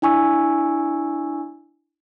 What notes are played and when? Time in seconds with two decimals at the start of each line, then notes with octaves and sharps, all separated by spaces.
0.02 D4 E4 G#5 C#6 E6